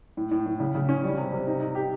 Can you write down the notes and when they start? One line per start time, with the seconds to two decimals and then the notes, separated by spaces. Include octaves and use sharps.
0.17 A2
0.31 A2
0.46 A2
0.60 C#3
0.75 C#3
0.89 C#4
1.04 G3
1.18 C3
1.32 C3
1.47 D#4
1.60 D#4
1.75 G4